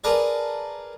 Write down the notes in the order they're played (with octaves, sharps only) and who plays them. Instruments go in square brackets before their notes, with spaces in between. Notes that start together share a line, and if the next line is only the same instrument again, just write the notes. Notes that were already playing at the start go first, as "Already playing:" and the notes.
[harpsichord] G#4 A#4 B4 D5 A5 A#5